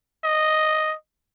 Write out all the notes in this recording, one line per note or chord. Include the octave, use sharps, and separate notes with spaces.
D#5